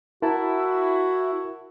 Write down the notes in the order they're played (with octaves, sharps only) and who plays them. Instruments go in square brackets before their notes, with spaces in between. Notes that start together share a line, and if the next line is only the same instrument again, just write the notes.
[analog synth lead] E4 [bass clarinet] F#4 [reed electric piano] A#4 A5